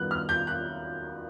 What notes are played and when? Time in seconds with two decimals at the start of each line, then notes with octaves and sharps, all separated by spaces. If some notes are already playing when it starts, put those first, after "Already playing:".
Already playing: F#2 D#3 G3 B3 F#6
0.11 F6
0.29 G6
0.47 F#6